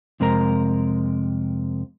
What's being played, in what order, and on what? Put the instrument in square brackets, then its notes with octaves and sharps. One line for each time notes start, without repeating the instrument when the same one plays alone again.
[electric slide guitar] F2 C3 G#3 A#4 A#5